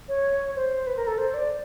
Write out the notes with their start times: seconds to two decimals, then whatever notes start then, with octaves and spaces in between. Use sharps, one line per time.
0.08 C#5
0.56 C5
0.87 B4
0.97 A#4
1.07 A4
1.18 C5
1.34 D5